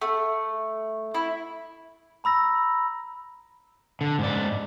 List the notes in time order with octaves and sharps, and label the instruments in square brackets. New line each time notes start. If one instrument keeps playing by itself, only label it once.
[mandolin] A3
E4
[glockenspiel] A#5 B5 E6 A#6
[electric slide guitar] D3
G#2 D5